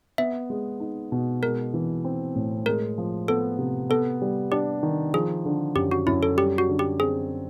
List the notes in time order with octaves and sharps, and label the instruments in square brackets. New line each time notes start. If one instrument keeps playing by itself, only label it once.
[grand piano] B3 [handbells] E5
[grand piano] G#3
D#4
B2
[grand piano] G#3 [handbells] A#4
[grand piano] E3
C4
A2
[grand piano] G#3 [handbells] A#4
[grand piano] F3
[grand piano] B3 [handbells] A4
[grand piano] C3
[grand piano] B3 [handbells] A4
[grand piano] G3
[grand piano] D4 [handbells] G4
[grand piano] D#3
[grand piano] F3 [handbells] G#4
[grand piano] D3
[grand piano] F#2 [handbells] G4
[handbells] F#4
[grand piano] F#2 [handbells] E4
[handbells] A4
[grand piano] G3 [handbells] G4
[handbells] F#4
[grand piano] D3
[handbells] G4
[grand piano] C4 [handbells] G#4